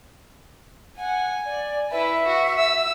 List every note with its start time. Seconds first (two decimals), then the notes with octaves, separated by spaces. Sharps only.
0.98 F#5 G#5
1.46 D5
1.91 E4 B4 E5
2.25 F#4
2.58 E6